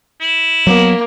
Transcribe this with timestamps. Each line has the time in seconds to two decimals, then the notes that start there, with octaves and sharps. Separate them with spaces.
0.21 E4
0.67 F#3 A#3 B3